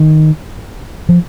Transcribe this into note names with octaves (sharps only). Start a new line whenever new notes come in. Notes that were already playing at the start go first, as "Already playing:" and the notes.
Already playing: D#3
F3